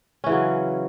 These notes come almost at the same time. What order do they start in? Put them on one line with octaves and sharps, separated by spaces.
C#4 E3 C#3 F#3